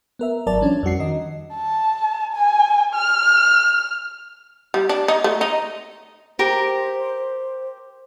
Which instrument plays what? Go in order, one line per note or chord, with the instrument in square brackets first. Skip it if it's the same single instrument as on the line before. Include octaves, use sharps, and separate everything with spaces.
[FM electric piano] B3 A#4 E5
G#1 F#3 A#4 D5 A5
F3 G3 C#4 D4
F2 G3 F#4 C7
D#3 D#5
[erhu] A5
G#5
F6
[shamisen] G3
D4
D#4
A3
D#4
[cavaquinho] G4 A#4 [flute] C5